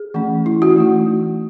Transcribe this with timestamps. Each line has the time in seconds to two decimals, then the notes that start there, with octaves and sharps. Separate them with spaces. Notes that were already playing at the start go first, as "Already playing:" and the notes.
Already playing: G#4
0.14 E3 A3 C#4
0.46 E4
0.62 F#4
0.76 E3 A3 D#4